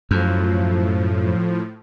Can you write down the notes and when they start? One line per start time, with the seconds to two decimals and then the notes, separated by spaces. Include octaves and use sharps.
0.11 F#2 A2 F3